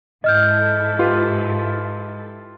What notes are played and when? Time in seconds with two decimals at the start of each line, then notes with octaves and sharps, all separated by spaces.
0.24 G#2 E4 A4 D#5 F6 G6
0.99 F4 G4 B4